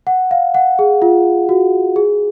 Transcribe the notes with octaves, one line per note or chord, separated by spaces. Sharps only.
F#5
F5
F#5
G#4
F4
F#4
G#4